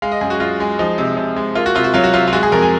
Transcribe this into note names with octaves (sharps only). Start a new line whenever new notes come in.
G#3 F5
D#5
F#2 G#4
F#4
F#2 F4
G#3
F3 D#4
C3
C3
G#3
A#3 F4
F#4
C3 F4
F#4
F#3 F4
F#4
C3 F4
F4
G#3 F#4
G#4
F2 A#4
G#5